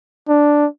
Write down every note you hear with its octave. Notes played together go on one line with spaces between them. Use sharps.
D4